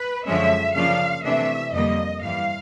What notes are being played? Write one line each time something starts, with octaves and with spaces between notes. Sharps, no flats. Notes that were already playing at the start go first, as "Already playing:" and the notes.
Already playing: B4
F#2 D3 F3 G#3 C#4 E5
C#3 F3 A#3 D4 F4 F5
C3 E3 A3 D4 E5
F2 D3 G3 A#3 D#5
G2 E3 G3 F5